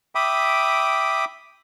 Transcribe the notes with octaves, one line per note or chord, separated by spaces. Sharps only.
E5 G5 B5 D6 D#6